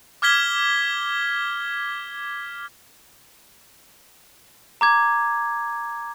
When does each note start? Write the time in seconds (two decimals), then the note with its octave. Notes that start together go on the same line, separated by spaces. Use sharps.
0.22 D6 F6 G#6 B6 G7
4.81 A#5 D6 G#6